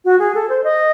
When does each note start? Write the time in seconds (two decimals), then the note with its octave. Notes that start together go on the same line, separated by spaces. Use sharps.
0.05 F#4
0.19 G#4
0.34 A4
0.49 C5
0.64 D#5